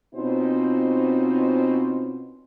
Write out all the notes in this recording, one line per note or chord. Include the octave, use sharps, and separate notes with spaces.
B2 C4 C#4 D#4 F4 C5